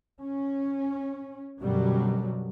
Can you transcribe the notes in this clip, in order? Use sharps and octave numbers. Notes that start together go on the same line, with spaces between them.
C#4
F#2 B2 D3 F#3 G3